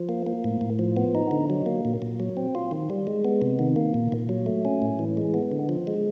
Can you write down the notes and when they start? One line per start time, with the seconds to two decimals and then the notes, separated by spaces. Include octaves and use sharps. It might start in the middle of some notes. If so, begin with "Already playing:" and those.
Already playing: F3
0.09 A#3
0.27 A#3
0.44 A2
0.61 A2
0.79 F3
0.97 B3
1.15 D#4
1.31 D3
1.50 F#3
1.66 A#3
1.85 A#2
2.02 A#2
2.20 F#3
2.37 C4
2.55 F4
2.71 D#3
2.90 G3
3.07 G#3
3.25 B3
3.42 C3
3.59 D#3
3.76 A#3
3.94 A#2
4.12 A#2
4.29 F#3
4.46 A3
4.65 C#4
4.82 A2
4.99 E3
5.17 G#3
5.34 B3
5.52 D3
5.69 F3
5.87 G#3